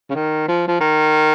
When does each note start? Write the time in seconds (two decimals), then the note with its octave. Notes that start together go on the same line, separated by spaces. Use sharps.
0.10 C#3
0.15 D#3
0.48 F3
0.68 F3
0.80 D#3